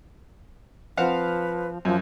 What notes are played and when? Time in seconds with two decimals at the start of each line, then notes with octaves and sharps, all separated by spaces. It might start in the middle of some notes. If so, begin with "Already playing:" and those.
0.97 F3 C4 B4 F5 F#5
1.85 F#2 F3